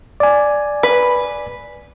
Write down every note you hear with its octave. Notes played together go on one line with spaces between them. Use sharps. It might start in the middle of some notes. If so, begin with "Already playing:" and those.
D5 G#5
B4